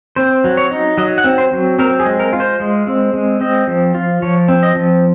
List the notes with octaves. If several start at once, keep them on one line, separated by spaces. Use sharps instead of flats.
C4 C5
F#3
C#5
D#4
F#3 D#5
F#5
C4
C5
F#3
C4 A#4
G#4
G#3
A#4
F4
C5
G#3
C4
G#3
C4 D#5
F3
F4
F3 C#5
C4
D#5
F3